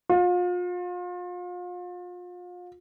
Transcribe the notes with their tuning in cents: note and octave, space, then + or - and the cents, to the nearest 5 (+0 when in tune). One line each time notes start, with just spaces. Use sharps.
F4 +35